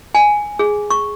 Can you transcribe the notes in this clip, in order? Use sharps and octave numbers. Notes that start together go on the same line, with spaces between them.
G#5
G#4
C#6